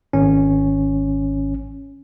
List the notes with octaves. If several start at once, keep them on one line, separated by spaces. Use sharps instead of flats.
G#1 C#4